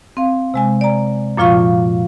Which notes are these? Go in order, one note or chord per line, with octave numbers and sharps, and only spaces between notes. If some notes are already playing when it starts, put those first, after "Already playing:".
C4 F5
C3 G#3 G#5
D5 A#5
F#2 A#2 F3 F4 F5 C#6